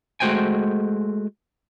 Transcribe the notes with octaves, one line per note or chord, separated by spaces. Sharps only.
G#3 A3 F#4 C5 G5 G#5